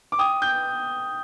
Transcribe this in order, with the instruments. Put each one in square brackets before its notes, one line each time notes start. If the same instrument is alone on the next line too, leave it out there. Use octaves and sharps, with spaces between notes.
[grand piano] D6
[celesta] G5 [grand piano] D#6
[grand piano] G6